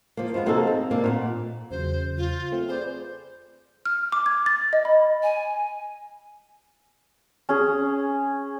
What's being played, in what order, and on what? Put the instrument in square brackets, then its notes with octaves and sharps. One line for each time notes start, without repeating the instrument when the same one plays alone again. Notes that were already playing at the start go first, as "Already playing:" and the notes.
[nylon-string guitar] F3 A#3
G#3 B3 F4 C5
C3 A#3 D#4 F#4 G#4 A4
C4 F4
C3 A#3 D4
A#2 C#5 F#5
[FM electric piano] E2 C#3 F#3 [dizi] C5
[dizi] F4
[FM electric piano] A3 C4
[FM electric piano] G#4 B4 D5 [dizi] C5
[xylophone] F6
D6
G#6
A6
D#5
B5
[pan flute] G#5
[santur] C#4 G#4